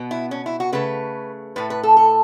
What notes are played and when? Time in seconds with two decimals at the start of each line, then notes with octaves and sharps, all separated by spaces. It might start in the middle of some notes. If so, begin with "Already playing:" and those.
Already playing: B2 B3
0.11 E4
0.31 C#4
0.46 E4
0.60 F#4
0.72 C#3 A3 B4
1.56 A2 A3 B4
1.70 B4
1.83 A4
1.97 A4